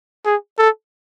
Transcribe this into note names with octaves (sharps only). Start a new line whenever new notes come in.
G#4
A4